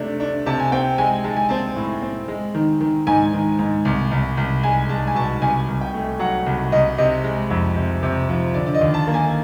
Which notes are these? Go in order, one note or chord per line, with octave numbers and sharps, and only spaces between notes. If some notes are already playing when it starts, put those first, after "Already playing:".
Already playing: C3 A3 D4
D4
C3 A5
G#5
C4 G5
G#3 G#5
G#3 A5
G#5
C4 A5
A2
C4
G#3
D#3
D#3
G#2 G#5
D#3
G#2
C2
C2
C2
G#3 G#5
G#3 A5
G#5
B2 A5
C2 G#5
C2
G5
A3
F#3 F#5
C2
C2 D#5
C3 D#5
G#3
F2
C3
C3
F3
D3 D5
D5
D#5
D#2
A5
A#3
G#5